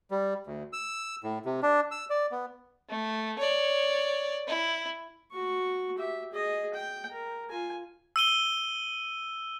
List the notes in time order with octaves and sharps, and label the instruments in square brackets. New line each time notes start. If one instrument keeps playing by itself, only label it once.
[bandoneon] G3
D2
E6
A2
C3
D4
E6
D5
B3
[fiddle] A3
C#5 D5
E4
[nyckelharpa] F#4 C#6
G4 E5
G#4 D#5
G5
A#4
F4 G#5
[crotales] E6 D#7 G7